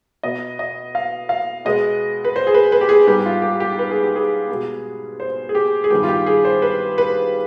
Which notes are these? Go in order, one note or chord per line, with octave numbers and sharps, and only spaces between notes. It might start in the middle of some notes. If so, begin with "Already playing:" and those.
B2 B3 D#5
D#5
F5
F5
B2 G#3 B3 D#5
B4
C5
G#4
B4
B4
G4
G#4
G#2 G3 B3 G4
F4
G4
G4
B4
G#4
G4
G#4
B2 G#3 B3
C5
G#4
G4
G#4
G2 D#3 G3 B3 G4
F4
G4
G#4
C5
B4
B4